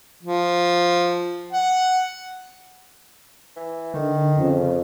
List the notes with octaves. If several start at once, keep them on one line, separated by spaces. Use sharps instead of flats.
F3
F#5
E3
D3 D#3
F2 C#3